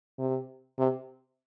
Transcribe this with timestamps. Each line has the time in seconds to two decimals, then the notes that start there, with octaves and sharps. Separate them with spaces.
0.18 C3
0.78 C3